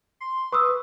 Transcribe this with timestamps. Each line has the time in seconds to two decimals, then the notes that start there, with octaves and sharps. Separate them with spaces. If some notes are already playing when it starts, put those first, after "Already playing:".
0.20 C6
0.52 B4 C#6 D#6 E6